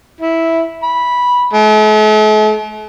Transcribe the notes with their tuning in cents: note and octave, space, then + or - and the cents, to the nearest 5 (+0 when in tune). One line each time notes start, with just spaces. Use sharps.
E4 -5
B5 -10
A3 -45